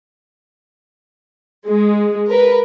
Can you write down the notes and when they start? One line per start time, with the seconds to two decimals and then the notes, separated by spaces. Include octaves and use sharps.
1.66 G#3
2.30 A#4 B4